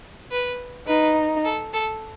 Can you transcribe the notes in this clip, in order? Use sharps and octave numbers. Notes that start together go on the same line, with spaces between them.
B4
D#4 B4
A4
A4